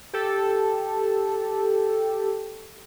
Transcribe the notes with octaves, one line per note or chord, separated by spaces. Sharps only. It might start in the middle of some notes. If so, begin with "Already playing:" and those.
G4 A4